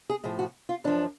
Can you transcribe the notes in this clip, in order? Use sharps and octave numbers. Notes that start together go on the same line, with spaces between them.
G#4
A2 F3 G#4
F#4
F4
F#2 F3 D4